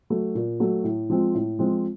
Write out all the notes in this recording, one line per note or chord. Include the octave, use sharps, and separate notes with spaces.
F#3 A3
A#2
F#3 A3
A2
F3 G#3 C4
A2
F3 G#3 C4